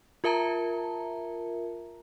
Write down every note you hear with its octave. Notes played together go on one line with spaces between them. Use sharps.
F4 A#4 E5 A5 A#5